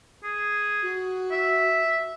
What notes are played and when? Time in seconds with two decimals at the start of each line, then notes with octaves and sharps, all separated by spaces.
0.24 G#4
0.82 F#4
1.31 E5